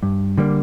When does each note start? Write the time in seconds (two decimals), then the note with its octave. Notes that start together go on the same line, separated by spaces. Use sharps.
0.03 G2
0.38 D3 G3 A#3